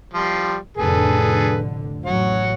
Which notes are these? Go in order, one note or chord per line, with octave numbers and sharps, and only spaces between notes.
F3 G3 F4
F1 A2 D3 G#4 A4 B4
A1 F#3 C#5 F#5